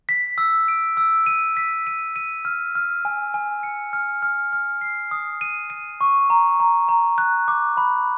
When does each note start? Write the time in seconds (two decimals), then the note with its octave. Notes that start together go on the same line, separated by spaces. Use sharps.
0.09 B6
0.38 E6
0.68 D7
0.97 E6
1.26 D#7
1.57 B6
1.87 D#7
2.16 D#7
2.45 F6
2.75 F6
3.05 G#5
3.34 G#5
3.63 C#7
3.93 F6
4.23 F6
4.53 F6
4.81 C7
5.11 D#6
5.41 D#7
5.70 D#7
6.01 C#6
6.30 A#5
6.60 A#5
6.89 A#5
7.18 F#6
7.48 D6
7.77 B5